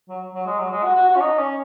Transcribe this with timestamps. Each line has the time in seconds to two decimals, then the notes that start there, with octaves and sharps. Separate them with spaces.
0.09 F#3
0.35 F#3
0.46 G#3
0.58 F#3
0.71 G#3
0.84 F#4
0.95 F#4
1.09 F#4
1.16 C#4
1.21 D#4
1.38 C#4